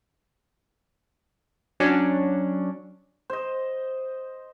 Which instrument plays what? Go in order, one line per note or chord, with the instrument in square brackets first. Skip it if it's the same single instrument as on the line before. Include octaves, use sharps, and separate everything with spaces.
[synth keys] F#3 C#4 D4
[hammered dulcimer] C5 D#5